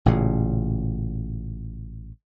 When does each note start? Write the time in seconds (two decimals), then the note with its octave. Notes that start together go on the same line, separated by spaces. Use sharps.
0.06 A1 A#2 C#3